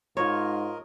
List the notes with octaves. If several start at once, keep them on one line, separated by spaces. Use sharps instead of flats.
G#2 F4 A#4 C#5 D#5